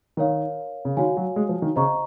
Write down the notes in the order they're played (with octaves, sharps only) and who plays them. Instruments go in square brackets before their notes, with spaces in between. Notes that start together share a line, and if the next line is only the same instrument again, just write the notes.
[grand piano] D#3 [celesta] A#4 C#5 F5
[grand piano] C#3
[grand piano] D#3 [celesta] F#4 C#5 F5 G#5
[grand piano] F#3
G#3
F3
D#3
[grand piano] C#3 [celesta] C5 D#5 A#5 C#6